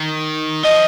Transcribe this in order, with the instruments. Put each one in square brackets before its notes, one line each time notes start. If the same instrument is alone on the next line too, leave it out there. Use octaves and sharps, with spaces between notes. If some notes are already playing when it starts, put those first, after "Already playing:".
Already playing: [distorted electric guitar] D#3
[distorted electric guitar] F3 [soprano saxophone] D#5